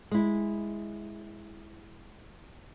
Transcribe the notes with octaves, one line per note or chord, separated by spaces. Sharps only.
G#3 E4